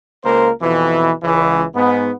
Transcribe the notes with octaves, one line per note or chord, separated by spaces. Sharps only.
C#2 A#3 A#4 C5
F2 B2 E3
C#2 E3
G#2 B3